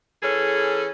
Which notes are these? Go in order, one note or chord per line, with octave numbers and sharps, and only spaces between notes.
E3 C#4 G#4 A4